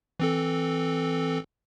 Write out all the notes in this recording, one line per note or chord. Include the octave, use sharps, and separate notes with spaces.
E3 C4 A4